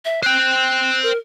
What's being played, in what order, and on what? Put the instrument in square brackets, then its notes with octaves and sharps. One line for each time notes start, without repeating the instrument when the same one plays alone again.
[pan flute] E5
[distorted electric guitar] C5 G5 [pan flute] F#6
[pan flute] A#4